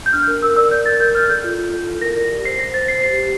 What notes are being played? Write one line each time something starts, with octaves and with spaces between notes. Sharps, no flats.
G6
D4 F6
A#4
A#4 E6
D5 E6
D5 G6
A#4 A6
D5 G6
D5 F6
A4 G6
F4
F4
A4
E4
A#4 A#6
D5
G4
C5 C7
C5 A#6
C5 A6
C5 C7
G4 C7
G4